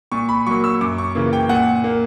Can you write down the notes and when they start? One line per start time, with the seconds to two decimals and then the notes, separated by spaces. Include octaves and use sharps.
0.12 A#2 C#6
0.29 B5
0.47 F#3 A#3 C#6
0.64 E6
0.81 F#2 D6
0.98 C#6
1.15 C#3 E3 A#3
1.33 G5
1.49 A#2 F#5
1.84 A#3